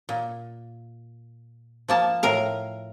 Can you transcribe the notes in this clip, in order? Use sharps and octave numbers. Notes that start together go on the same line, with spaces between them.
A#2
F3 A#3 A5
A2 A#4 F5